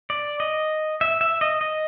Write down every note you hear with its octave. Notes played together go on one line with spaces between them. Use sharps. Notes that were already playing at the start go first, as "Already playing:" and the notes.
D5
D#5
E5
E5
D#5
D#5